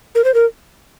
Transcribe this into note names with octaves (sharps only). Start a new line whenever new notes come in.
A#4
C5
A#4